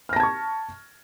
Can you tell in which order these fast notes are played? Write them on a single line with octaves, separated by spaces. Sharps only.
F6 A#6 A5 G#6 C#6